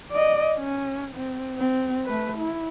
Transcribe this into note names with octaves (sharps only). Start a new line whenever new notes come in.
D5 D#5
C#4
C4
C4
A3 B4
E4